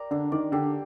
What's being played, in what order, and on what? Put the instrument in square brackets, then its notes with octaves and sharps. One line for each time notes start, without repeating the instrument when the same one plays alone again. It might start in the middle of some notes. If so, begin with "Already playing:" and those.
Already playing: [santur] G4 A#4 D5
[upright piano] D3 [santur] D4
[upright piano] D#3 [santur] D5
[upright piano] D3 [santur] G4